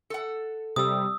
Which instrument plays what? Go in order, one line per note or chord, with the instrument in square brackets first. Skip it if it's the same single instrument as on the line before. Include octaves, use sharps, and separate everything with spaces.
[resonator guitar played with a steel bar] A4 F#5
[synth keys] C3 G3 [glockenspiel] D#6 E6